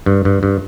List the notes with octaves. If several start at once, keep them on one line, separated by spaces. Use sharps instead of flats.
G2
G2
G2